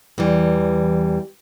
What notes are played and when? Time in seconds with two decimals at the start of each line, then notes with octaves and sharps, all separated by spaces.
0.18 E2 E3 G3